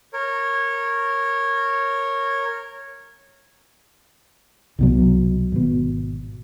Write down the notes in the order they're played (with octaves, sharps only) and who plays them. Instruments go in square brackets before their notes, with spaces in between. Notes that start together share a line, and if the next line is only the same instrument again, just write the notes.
[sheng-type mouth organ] A#4 C#5
[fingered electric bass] C2 B2 F#3
G#1 B2